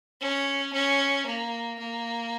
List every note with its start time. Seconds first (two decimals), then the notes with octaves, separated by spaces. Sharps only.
0.21 C#4
0.73 C#4
1.26 A#3
1.79 A#3